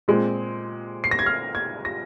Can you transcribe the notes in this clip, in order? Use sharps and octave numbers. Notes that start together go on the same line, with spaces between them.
A#2 G#3 C4
C7
A#6
G#6
F6
G#6
A#6